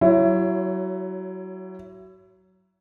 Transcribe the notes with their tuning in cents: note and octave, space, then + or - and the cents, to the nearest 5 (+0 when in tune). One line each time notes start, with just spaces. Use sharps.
F#3 +25 E4 +25 C#5 +0